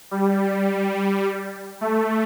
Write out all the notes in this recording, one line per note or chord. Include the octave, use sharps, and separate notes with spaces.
G3
A3